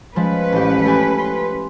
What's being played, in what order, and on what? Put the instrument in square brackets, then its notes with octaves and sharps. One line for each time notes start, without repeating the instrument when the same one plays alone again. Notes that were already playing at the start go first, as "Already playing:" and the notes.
[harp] F3 G#3 [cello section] C#4 B4
[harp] A1 G4
A3 G4 G#5
C6